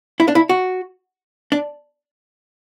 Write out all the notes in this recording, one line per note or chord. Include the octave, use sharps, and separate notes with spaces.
E4
D4
E4
F#4
D4